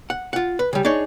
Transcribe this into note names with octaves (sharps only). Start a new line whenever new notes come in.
F#5
F4 F#5
B4
C#3 G3
D4 D#4 G#4 C#5